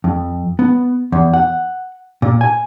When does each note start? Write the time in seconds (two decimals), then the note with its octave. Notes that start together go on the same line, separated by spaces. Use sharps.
0.04 F2
0.59 B3
1.12 E2
1.34 F#5
2.22 A#2
2.41 G#5